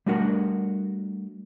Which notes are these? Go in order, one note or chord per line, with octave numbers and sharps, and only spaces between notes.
G3 A3 D4 F#4 A#4 F#5